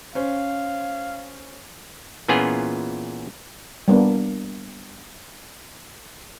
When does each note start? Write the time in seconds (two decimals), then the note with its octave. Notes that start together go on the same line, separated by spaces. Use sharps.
0.15 C#4 C5 F5
2.28 A#2 E3 B3 C#4 F4 G#4
3.88 G3 A#3 B3 D4